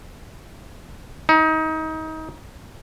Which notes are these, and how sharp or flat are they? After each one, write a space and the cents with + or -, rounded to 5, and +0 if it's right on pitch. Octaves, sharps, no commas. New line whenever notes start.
D#4 +25